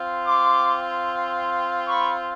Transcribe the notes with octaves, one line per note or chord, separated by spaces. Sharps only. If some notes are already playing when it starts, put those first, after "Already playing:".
Already playing: C4 F4
C6 D6
B5 C#6